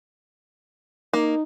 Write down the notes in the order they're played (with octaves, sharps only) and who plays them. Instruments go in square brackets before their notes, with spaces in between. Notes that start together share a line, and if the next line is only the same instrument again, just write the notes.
[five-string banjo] A#3 [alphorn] D#4